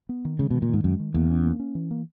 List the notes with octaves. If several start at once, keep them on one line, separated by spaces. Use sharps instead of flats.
B3
D#3
C#3 G#3
B2 D#3
A#2
G#2 D#3
F#2 G#3
D#3
E2 A#3
C#4
A#3
C#4
E3
A#3